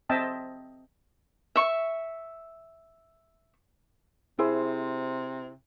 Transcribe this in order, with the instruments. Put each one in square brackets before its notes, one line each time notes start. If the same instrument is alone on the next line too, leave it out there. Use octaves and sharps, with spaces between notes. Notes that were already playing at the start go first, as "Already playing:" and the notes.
[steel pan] C4 D#5 E5 G5 A5
[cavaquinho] E5 C#6
[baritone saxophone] C3 [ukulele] E4 G#4 C5